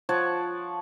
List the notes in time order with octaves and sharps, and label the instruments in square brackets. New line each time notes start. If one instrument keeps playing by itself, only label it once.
[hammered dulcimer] F3 C#5 F#5 A5